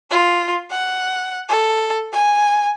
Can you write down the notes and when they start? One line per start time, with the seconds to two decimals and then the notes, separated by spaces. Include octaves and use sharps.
0.10 F4
0.71 F#5
1.49 A4
2.13 G#5